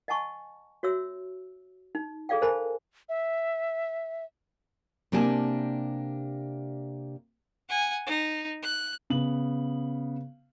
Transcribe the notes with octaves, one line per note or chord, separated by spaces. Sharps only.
D#5 F#5 G#5 A5 C#6
F#4 C#5 E5 E6
D#4
G#4 A4 D5 F5 G5
G#4 A#4 C5 G#5 A5 B5
E5
C3 A#3 D4 G4 G#5 A5
F#5 G#5
D#4
F#6
C#3 B3 F#7